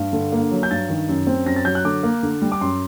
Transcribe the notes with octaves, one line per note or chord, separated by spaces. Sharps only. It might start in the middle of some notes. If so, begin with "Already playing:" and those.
Already playing: G2
D3
A#3
F#3
G6
G2 A6
D#3
F#2
C4
F#2 A#6
A6
F#3 G6
F#6
D3 D6
A#3
D3
G3
D6
F#2 C6